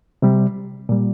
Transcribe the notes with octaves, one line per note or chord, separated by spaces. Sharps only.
C3 G3
A#2 G3